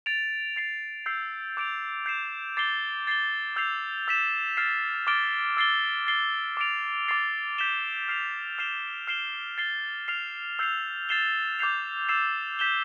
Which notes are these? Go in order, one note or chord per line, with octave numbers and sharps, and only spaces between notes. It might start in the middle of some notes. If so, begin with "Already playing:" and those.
A6 D7 F7
A6 C7 F7
E6 G6 C7
D6 G6 D7 F7
G6 C7 E7
D6 A6 C7 G7
A6 C7 G7
E6 G6 C7 F7
E6 G6 B6 E7
F6 A6 C7 E7
D6 F6 A6 D7 G7
E6 A6 C7 G7
A6 C7 G7
D6 A6 D7 F7
D6 A6 C7
G6 B6 E7 G7
F6 C7 F7
F6 C7 E7 G7
F6 C7 E7 G7
A6 C7 G7
F6 C7 F7
E6 G6 C7 F7
A6 C7 E7 G7
D6 G6 C7 F7
E6 A6 C7 E7
G6 B6 E7 G7